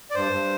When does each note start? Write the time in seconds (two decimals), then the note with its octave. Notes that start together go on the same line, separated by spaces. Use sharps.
0.10 D5
0.15 G2 C5
0.32 G2